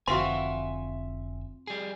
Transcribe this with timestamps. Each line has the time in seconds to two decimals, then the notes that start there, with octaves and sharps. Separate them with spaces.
0.08 F1 D3 C4 F4 F#4 E5 G#5 C6
1.67 G3 G#4